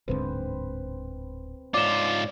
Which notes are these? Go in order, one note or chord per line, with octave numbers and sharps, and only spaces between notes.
D1 G#2 D3 C4 B4 C5
G#2 F4 C#5 D5 D6 E7